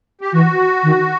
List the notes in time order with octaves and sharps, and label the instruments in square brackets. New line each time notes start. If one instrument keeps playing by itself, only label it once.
[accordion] G4
[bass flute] E3 [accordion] F#4
[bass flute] D#3